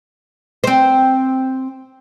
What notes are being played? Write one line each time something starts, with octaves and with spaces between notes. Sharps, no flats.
C4 C5